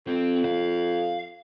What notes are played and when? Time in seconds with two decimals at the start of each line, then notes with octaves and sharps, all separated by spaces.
0.07 F2 C4
0.45 F5